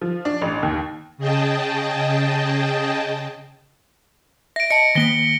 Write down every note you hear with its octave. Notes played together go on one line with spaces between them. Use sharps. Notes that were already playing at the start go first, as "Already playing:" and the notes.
F3
D4
A1
D#2
C#3 G#4 D#5 G5 A5
E5 A#6 D7
D#5 A5 C#7
D#3 A#3 A#6 B6 G7